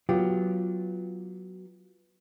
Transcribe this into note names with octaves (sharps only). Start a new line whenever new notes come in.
F#3 B3 F4 G4